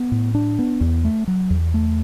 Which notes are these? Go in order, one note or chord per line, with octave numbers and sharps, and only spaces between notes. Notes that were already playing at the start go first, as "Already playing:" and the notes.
Already playing: B3
A2
D4
B3
E2
A3
F#3
E2
A3